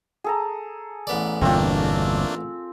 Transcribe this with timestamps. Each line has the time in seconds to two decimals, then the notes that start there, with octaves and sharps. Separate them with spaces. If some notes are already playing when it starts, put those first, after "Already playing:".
0.24 G#4 A4 A#5
1.07 A1 B3 D5
1.42 G1 E2 B2 A3 A#3 C4 D4 F4